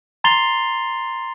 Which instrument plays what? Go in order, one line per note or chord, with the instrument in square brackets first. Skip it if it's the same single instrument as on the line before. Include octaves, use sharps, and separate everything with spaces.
[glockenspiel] A#5 C6 A6 C7 F7 G7